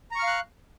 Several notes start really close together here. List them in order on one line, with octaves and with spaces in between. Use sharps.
A#5 C#6 F6 F5 F#6